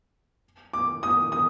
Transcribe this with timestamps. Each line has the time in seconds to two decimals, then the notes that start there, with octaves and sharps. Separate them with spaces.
0.73 D6
1.03 D#6
1.32 D#6